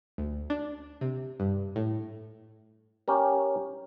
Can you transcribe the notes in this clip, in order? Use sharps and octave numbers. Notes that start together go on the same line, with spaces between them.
D2
D4
C3
G2
A2
C#4 G4 A#4